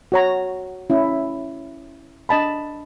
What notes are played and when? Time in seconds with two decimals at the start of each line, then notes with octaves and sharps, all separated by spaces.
0.12 F#4 C#5 A#5
0.90 C#4 E4
2.29 D4 D#5 A5 B5